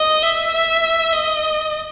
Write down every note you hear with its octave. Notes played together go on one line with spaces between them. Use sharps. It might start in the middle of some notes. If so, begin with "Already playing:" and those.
Already playing: D#5
E5
E5
D#5